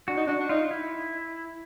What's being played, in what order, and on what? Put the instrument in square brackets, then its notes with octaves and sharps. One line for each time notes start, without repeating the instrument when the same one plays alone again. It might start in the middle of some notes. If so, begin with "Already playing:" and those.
[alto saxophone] D4 [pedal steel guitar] F#4
[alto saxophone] D#4
[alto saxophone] D4 [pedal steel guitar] F#4
[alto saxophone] D4
[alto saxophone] D#4 [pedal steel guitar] F4
[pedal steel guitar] E4